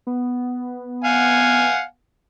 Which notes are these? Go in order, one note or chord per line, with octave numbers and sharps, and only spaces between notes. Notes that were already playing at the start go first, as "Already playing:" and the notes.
B3
F5 F#5 G#5